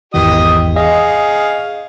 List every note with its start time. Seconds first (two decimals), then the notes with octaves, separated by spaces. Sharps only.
0.14 G#1 E2 E3 G4 D#5 D#6
0.76 G#4 D#5 F5